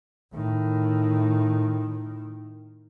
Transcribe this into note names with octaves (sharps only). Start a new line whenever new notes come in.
A2 D#3